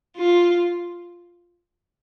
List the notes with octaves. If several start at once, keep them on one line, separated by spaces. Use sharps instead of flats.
F4